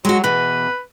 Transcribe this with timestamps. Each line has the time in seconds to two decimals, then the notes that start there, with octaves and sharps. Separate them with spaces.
0.05 F#3 G#3 F#4
0.24 B2 E3 B4